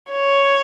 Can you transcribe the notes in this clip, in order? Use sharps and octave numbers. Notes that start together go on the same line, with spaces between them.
C#5